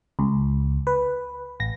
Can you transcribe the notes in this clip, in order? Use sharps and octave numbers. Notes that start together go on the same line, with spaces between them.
C#2
B4
A1 A#6